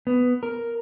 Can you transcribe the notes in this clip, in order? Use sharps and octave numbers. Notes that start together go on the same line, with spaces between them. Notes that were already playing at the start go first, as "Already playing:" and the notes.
B3
A#4